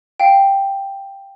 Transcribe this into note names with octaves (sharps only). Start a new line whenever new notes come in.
F5 G5